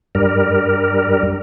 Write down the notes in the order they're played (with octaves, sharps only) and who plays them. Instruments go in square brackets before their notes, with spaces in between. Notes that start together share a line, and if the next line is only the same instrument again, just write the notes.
[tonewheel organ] G2 G3 A#4